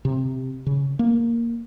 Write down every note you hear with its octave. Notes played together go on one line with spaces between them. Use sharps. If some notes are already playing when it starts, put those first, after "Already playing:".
C3
C#3
A#3